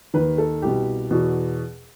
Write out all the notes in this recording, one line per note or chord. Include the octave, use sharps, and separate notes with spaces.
D#2 D#3 B4
A4
C2 B2 G4
E2 B2 F#4